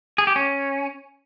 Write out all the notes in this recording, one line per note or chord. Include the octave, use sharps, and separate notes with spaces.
G#4
G4
C#4